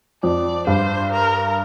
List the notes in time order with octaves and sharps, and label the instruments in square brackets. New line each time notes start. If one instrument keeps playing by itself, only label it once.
[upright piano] F2 [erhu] D5
[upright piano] G2 [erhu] C5
[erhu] A#4